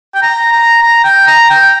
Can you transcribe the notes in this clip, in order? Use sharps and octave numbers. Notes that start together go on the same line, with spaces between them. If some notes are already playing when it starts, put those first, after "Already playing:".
G5
A#5
A#5
A#5
G5
A#5
G5